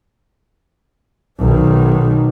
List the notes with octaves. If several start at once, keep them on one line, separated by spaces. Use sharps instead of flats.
B1 D#3